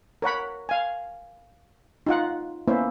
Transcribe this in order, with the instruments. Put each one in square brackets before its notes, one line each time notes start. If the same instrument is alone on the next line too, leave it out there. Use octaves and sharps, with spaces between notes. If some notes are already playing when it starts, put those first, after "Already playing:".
[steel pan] A#4 C#5 F#5 B5
F5 G#5
D#4 F4 F#5
A#3 B3 C#4 E4 C5